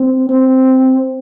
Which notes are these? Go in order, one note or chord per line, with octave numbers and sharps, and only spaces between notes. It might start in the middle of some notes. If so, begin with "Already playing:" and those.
Already playing: C4
C4